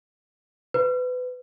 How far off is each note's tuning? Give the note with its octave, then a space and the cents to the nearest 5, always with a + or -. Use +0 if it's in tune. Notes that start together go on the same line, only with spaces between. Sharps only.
B4 +25